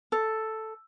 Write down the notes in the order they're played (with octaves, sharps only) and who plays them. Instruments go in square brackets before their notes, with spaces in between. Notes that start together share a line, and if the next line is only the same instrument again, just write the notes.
[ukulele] A4